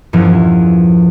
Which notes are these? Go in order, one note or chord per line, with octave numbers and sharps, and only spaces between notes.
E2 G2 A#2 E3 F3 C#4